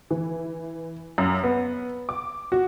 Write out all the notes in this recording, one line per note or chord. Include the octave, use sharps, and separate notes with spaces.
E3
F#2
B3
D6
F#4